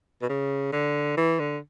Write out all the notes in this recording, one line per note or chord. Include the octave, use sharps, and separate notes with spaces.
B2
C#3
D3
E3
D3